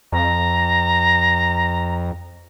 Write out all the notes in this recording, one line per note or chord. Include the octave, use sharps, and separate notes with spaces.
F2 A#5